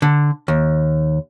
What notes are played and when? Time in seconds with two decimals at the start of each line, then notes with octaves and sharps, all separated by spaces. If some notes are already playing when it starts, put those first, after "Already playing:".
0.02 D3
0.48 D#2